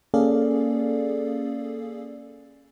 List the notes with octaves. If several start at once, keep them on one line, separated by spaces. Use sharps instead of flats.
A#3 C#4 G#4 A4 D5 F5